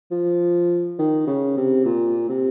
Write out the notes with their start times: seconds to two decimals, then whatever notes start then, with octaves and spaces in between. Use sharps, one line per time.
0.11 F3
0.99 D#3
1.27 C#3
1.57 C3
1.85 A#2
2.29 C3